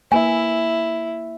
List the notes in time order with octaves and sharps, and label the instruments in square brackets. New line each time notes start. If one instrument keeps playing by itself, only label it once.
[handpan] A#3 B4 E5 [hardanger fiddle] E4 [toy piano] G#5